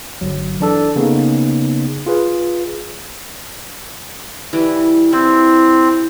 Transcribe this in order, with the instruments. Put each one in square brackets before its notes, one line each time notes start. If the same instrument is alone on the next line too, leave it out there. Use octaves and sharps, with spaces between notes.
[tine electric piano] G1 F#3
E3 D4 A4
C#3 A#3 B3 D#4
F4 G#4 B4
[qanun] E3 G3
[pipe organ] C4 [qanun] E4